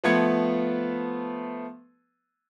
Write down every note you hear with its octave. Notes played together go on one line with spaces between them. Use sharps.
F3 A3 B3 B4 G#6 C#7